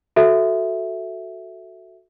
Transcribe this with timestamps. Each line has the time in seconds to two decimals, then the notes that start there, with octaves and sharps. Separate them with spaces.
0.16 F#4 A4 E5